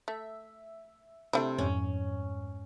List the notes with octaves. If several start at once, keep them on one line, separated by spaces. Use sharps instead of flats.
A3 E5
C3 A3 C4 D4 E4
F2 G#2 C#4